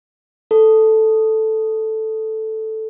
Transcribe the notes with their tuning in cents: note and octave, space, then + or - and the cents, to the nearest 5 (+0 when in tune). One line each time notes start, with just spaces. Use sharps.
A4 -5